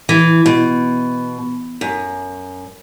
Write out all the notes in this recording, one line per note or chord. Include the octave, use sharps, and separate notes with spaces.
E3
B2
F#2